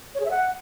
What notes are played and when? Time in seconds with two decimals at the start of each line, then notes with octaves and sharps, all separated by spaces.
0.15 C#5
0.20 G#4
0.25 E5
0.31 F#5